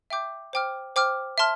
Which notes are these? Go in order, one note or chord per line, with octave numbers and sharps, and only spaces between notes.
E5 G5 D6 G6
C5 G5 D6 F6
C5 G5 D6 F6
E5 A5 C6 F6